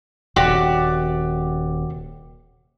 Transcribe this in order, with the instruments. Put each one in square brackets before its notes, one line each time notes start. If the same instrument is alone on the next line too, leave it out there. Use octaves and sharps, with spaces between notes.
[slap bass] D#1 C3 [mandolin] F#4 G4 D5